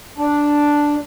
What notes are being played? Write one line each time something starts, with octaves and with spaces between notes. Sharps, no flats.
D4